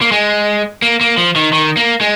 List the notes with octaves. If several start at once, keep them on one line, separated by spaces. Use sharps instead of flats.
A#3
G#3
A#3
A#3
F3
D#3
D#3
A#3
G#3